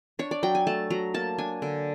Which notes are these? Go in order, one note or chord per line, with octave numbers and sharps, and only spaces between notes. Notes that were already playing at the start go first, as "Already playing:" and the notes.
D4 C#5
D5
F#3 G5
G#5
A3 A5
F#3 A#5
A#3 A5
D4 G#5
D3